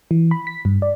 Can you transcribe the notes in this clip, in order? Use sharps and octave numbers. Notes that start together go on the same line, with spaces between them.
E3
B5
B6
G2
D5